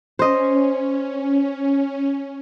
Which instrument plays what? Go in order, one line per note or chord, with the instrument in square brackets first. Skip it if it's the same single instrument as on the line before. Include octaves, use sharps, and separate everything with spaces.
[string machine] C#4 [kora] C5 D#5